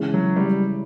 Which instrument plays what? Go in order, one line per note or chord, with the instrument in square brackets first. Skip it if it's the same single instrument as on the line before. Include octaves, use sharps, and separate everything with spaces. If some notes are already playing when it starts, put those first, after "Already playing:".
Already playing: [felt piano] C#3 E3 G#3
[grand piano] F#3
G3